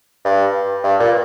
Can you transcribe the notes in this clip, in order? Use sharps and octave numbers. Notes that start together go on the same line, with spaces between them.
G2
G2
A#2